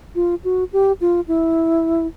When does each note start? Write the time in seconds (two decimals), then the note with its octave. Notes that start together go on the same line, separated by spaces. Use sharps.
0.15 F4
0.44 F#4
0.73 G4
1.01 F4
1.28 E4